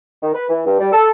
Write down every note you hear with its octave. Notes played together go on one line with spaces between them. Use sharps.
D#3
B4
E3
G2
G3
A4